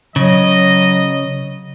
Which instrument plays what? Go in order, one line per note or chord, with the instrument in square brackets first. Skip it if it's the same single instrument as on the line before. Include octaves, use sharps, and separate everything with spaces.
[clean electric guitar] C#3 [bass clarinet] F#3 [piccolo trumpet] D#5